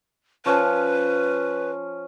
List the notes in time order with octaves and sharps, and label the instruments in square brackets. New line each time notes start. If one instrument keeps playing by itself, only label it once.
[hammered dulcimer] F3 C#4 F5 [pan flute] B4